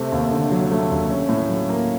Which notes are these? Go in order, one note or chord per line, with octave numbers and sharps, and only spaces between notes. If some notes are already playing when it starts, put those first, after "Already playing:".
Already playing: C3 A3
D#2
D3
F#3
A3
D#2
C#4
A2
F#3
A#3